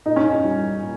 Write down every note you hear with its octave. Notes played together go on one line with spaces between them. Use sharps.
A#2 D#4
C#4
D#4
G3
A#2